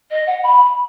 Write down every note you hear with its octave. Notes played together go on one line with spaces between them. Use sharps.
D#5
F#5
B5